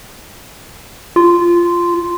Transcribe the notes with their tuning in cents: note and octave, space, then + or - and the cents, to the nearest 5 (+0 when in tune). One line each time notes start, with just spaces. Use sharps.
F4 -10